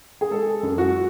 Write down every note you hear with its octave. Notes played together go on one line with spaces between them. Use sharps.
G#4
G#3 A4
F#2
F#4